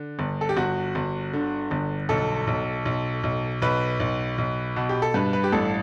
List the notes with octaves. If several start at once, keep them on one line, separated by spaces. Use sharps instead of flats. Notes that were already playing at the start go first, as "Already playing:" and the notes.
Already playing: D3
G1
A4
G4
G1 F#4
G1
D3
G1
B1 A4
B1
B1
B1
B1 B4
B1
B1
B2
G4
A4
G2 B4
B4
G4
A1 A4